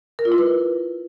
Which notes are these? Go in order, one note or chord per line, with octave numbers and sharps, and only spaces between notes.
A#4
F4
E4
B4